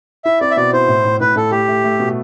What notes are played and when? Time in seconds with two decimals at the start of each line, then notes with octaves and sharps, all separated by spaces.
0.25 E4 E5
0.41 C4 D5
0.51 E5
0.56 B2 D5
0.73 E4 C5
0.88 A2
1.05 A2
1.20 A2 B4
1.36 A2 A4
1.51 A3 G4
1.68 A3
1.84 A3
1.99 B2